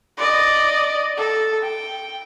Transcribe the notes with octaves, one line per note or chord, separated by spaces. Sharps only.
D5 D#5
A4
G5